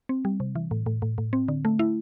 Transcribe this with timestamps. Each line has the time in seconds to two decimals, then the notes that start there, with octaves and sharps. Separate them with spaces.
0.09 C4
0.25 G3
0.40 C3
0.56 E3
0.71 A2
0.86 A2
1.02 A2
1.18 A2
1.33 C4
1.48 D3
1.65 A3
1.79 E4